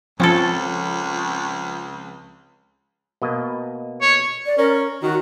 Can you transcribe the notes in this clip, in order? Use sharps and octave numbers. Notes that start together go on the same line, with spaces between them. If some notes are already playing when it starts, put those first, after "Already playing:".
C#2 F3 C4 C#4 F4 A4
B2 A#3 D#5
C#5
D5
C#4 A#4
D#3 F#4